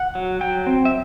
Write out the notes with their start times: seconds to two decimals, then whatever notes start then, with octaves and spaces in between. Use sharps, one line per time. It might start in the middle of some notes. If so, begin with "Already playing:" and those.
Already playing: F#5
0.15 F#3
0.41 F#3 G5
0.67 C4
0.85 E5